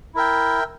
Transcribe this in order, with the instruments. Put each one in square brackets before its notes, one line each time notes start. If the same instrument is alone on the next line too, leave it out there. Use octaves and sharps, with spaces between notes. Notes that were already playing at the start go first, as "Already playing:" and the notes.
[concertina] E4 A#4 E5 G5